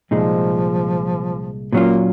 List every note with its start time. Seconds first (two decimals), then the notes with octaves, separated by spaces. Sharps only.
0.11 C2 A#2 F3 G#3 D#4
1.72 A#2 F#3 A#3 C#4 F4